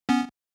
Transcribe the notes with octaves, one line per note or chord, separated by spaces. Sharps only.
B3 C#4